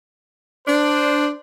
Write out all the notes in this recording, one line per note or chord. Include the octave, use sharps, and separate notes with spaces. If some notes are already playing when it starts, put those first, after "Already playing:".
D4 C5